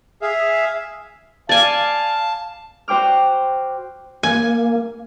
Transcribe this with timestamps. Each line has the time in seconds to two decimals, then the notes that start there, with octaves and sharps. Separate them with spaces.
0.22 G#4 E5 F5
1.49 D5 F5 G#5 A5
2.88 F#4 C5 G5 D6 F6
4.23 A#3 G#5